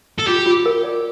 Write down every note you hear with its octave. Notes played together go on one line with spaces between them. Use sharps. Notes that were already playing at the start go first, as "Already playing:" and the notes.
A4
F4 G4
F4
A#4
D5